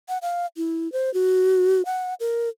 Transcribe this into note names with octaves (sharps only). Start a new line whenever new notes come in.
F#5
F5
E4
C5
F#4
F#5
A#4